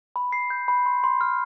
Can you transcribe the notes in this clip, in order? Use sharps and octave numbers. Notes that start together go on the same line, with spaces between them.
B5
C7
G6
B5
C6
C6
F6